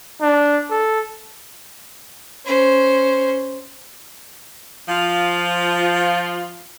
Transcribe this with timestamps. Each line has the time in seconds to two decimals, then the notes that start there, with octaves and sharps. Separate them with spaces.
0.21 D4
0.71 A4
2.46 C#4 C5
4.89 F3 F4